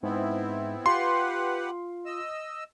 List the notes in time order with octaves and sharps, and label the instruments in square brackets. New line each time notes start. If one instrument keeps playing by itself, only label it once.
[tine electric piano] G#2 [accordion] B3 C4 E4
[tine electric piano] F4 [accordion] G4 B4 F#5 [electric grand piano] C6
[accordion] D#5 E6